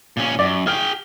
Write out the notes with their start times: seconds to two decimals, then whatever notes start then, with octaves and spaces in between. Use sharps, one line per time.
0.17 A#2 C#4
0.39 F#2 D5
0.67 G#4 G5 F6